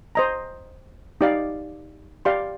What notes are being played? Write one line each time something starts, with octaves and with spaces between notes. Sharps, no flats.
C5 D#5 A#5
D#4 G4 D5 F5
G4 D5 F5 C6